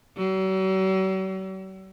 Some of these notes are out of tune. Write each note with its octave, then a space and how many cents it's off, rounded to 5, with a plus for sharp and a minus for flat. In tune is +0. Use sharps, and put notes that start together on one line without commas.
F#3 +45